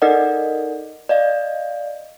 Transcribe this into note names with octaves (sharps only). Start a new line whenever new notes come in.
D#4 A4 A#4 D5 D#5 F#5
D5 D#5 F5